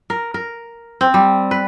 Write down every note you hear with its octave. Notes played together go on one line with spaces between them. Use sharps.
A#4
A#4
C4
G3
B4